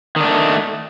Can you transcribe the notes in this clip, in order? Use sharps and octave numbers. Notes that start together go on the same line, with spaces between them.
D#3 A3 D4